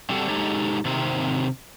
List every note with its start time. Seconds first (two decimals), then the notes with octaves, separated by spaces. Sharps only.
0.09 G3 C4 D4 F#4 G4 A4
0.28 G#3 D#4 G4 A4 C#5
0.85 C3 D#3 C4